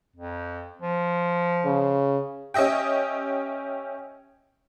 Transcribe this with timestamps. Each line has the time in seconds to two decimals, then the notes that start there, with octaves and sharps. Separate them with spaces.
0.16 F2
0.82 F3
1.65 C#3
2.54 C#4 G4 D#5 E5 G5